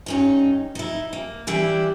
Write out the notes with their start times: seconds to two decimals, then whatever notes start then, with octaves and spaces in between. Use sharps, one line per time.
0.06 G2 C#4 D#4
0.75 D#4 E4
1.13 A#3
1.47 E3 G3 D4 E4 G4